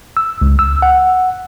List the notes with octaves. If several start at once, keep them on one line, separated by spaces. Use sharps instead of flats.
E6
C#2
E6
F#5